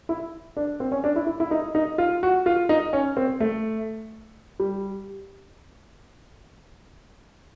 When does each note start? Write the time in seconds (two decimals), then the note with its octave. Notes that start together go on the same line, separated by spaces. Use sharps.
0.09 E4
0.57 D4
0.80 C4
0.92 C#4
1.04 D4
1.16 E4
1.27 E4
1.40 E4
1.51 D#4
1.75 D#4
1.98 F4
2.23 F#4
2.46 F4
2.69 D#4
2.93 C#4
3.17 C4
3.40 A3
4.60 G3